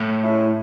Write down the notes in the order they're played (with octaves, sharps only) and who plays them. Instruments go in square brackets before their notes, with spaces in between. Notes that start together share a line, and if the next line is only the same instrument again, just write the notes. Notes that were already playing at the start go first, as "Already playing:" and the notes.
Already playing: [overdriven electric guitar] A2
[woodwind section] G#3 C#4 E4